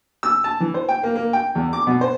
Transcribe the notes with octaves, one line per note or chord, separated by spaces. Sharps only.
E6
A5
E3
C5
G5
A#3
A#3
G5
E2
D6
B2
C5